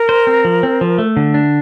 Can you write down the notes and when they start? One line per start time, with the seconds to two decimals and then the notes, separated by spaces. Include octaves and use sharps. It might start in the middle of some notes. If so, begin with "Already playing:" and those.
Already playing: A#4
0.09 C5
0.27 C4
0.45 F3
0.63 C4
0.81 F3
0.98 A3
1.17 D3
1.34 D4